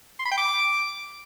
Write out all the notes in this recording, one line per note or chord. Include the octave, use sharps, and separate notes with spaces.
C6
B5
G5
D6